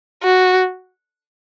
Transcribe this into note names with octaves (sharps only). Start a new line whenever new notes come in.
F#4